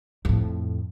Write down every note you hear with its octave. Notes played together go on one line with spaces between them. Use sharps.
F2 A2